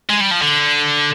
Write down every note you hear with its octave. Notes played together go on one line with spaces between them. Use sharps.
G#3
G3
F3
D3